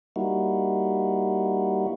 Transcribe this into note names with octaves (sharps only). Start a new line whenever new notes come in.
G3 A#3 D#4 E4 F#4